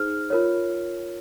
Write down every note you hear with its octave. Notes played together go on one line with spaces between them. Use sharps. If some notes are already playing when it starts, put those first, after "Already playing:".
Already playing: D#4 G#4 C5 F6
F4 A#4 C#5